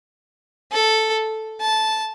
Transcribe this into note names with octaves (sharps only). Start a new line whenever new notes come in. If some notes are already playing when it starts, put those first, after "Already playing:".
A4
A5